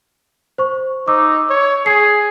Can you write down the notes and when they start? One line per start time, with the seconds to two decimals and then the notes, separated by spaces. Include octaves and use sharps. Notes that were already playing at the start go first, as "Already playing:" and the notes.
0.58 C5 C#6
1.08 D#4 D6 E6
1.50 C#5
1.86 G#4 G#6 C7